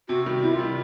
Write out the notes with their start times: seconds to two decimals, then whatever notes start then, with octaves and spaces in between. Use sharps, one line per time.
0.09 C3 F#4
0.26 D#3 G3
0.42 C3 E4
0.53 F4
0.59 D#3 G3